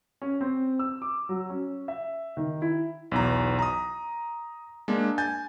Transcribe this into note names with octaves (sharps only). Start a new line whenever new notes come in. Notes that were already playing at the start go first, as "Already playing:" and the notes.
C#4
C4
E6
D6
F#3
C#4
E5
D#3
E4
B1 E2 A#5
A#5 D#6
G#3 A#3 D4
G#5 G6 A6